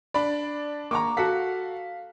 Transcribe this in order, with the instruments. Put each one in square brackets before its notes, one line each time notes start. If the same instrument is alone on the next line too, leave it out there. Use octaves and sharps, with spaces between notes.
[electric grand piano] D4 D5 [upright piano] B5
[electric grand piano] A#3 [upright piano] A#5 C#6 D6
[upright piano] F#4 A4 F#5 [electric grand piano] F5 B6